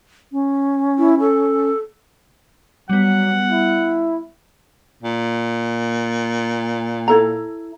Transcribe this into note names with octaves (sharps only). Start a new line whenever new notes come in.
C#4
E4
A4
F#3 G3 B3 F#5
E4
A#2
E4 A4 A#5